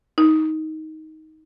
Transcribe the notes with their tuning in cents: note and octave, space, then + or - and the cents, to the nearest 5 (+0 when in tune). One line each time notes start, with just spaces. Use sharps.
D#4 +15